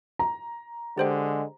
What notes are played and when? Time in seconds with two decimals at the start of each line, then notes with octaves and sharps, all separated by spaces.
0.19 A#5
0.98 D3 G#3 G4 C5 G5